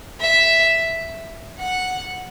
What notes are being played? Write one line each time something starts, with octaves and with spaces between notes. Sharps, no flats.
E5
F#5